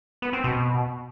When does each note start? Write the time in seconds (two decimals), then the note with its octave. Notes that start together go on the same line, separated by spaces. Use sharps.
0.22 B3
0.33 C4
0.44 B2